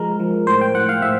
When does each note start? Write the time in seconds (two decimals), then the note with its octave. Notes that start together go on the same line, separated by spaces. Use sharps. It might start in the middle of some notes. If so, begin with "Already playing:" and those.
Already playing: F3 G#3 A#4
0.20 F3
0.47 A2 C5
0.61 G5
0.75 A2 F#5
0.89 F5
1.02 A2 E5